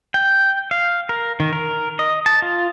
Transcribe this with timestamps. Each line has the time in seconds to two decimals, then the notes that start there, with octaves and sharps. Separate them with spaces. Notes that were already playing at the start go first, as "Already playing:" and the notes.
0.14 G5
0.71 F5
1.09 A#4
1.40 D#3
1.53 A#4
1.99 D#5
2.26 A5
2.42 F4